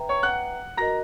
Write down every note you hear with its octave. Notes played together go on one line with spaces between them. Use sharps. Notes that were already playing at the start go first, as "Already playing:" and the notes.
Already playing: B4 E5 G5 A#5
C#5 C#6
F#5 F#6
F#4 A#4 D#5 A#5 A#6